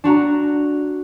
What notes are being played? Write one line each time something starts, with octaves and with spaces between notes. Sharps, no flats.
D4 F#4 A#5